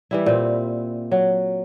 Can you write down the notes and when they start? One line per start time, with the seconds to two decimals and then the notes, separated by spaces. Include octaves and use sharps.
0.11 E3 G3 E4
0.26 A#2 C4
1.12 F#3